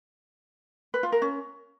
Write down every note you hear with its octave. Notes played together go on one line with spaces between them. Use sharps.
B4
F4
A#4
C#4